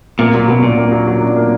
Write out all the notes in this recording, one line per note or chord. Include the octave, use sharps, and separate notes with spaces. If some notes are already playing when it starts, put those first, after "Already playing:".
A#2 A#3
A#2 F#3
B2 F#3
A#2 D4
A#3
F#3
F#3
D4
A#3